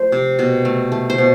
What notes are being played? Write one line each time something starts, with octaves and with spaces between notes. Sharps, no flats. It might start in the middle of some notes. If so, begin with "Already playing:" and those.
Already playing: F3 A3 C5
C3
B2
A3
A3
C5
B2